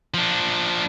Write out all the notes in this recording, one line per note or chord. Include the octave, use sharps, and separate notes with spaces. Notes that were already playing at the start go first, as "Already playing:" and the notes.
F3 D4